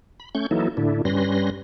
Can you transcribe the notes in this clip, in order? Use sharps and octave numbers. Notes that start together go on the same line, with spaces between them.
B5
A3 C#4 C#6 G6
E3 F#3 A#3 D#4 E4 A4
A2 D3 D4 E4
G2 G3 C#4 B4 C6 A#6